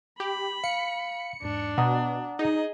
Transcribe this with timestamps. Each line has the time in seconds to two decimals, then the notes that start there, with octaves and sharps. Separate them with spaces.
0.20 G4 B5
0.64 F5 C#7
1.42 E2 G#2 D4
1.78 B2 F#5 A#5 D#6
2.39 D#4 G#4 D#5